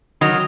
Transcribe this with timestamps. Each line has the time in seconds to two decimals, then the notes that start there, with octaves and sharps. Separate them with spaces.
0.21 D#3 F#3